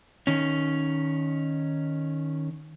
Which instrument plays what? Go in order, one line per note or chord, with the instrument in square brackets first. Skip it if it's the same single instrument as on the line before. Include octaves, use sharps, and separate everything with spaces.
[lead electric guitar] D#3 C#4